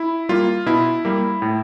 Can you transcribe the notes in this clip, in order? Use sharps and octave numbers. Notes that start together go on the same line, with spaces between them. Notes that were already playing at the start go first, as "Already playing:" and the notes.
Already playing: E4
G3 A#3 F4
B2 E4
G3 A#3
A2